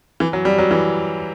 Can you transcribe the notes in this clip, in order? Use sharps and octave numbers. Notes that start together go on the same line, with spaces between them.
E3
F#3
G3
F#3
E3